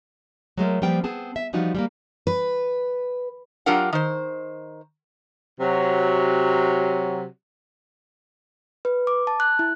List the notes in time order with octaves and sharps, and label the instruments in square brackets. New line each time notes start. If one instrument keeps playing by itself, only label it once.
[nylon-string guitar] F#3 G#3 A3 A#4
F3 G3 A#3 C4 B4 G5
B3 C4 G#4 A5
E5
E3 F3 G3 D#4 F4 F#4
G3 G#3 A#3
[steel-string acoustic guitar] B4
[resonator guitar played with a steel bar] F#3 D4 F4 G4 A#4 F#5
D#3 C5
[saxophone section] C3 F#3
[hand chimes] B4
D6
A5
F#6
E4